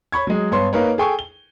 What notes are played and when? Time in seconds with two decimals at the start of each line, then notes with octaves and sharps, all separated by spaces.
0.12 C#5 B5 C#6 G#6
0.27 F#3 G#3
0.51 G2 B3 C#5 C6
0.73 A#3 D#4 A#4 B4 C#5
0.98 G#4 A4 G5 G#5 C#6
1.19 G7